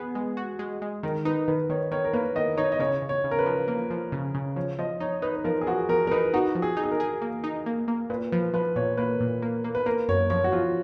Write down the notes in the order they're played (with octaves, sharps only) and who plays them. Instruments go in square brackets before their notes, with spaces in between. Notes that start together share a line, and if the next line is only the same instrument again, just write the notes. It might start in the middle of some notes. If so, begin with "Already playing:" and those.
Already playing: [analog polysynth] B3 [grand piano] G#4
[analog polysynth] G#3
F#4
G#3
G#3
[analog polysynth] D#3 [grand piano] A#4
[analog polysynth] D#4 [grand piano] B4
[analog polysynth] D#3 [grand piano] B4
[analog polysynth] D#3 [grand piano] C#5
[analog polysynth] D#3 [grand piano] C#5
[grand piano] A#4
[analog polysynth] A#3 [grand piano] B4
[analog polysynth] D#3 [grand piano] D#5
[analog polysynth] D#4 [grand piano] C#5
[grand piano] D#5
[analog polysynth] C#3 [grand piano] C#5
[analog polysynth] C#3
[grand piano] C#5
[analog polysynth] C#3
[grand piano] A#4
B4
[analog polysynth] F3
A#3
F3
C#3
C#3
[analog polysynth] F3 [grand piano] C#5
[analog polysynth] F3 [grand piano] D#5
[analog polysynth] D#4 [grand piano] C#5
[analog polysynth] D#4 [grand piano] B4
[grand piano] B4
[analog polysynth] F3 [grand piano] A#4
[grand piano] G#4
[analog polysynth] F3 [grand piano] F#4
[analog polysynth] F3 [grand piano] A#4
[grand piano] A#4
[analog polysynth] D#4 [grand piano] B4
[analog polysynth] D#4 [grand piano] F#4
[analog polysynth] F3
[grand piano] G#4
[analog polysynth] D#4
[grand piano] G#4
A#4
[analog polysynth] G#4
A#3
D#4
A#3
A#3
[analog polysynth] A#2 [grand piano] B4
[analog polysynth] F3 [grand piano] B4
[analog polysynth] F3 [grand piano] B4
[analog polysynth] A#2 [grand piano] C#5
[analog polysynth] A#3 [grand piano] B4
[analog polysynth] A#2
A#3
A#3
[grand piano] B4
[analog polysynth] A#3 [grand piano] A#4
[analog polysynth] F#2 [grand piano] C#5
[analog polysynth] F3 [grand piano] C#5
[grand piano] F#4
[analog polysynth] F3 [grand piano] F4